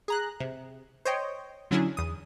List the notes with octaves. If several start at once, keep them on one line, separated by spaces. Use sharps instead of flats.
G#4 A#5 F#6
C3
C5 C#5 D#5 G5
D3 F#3 C#4 D4 E4 G#4
E2 D#6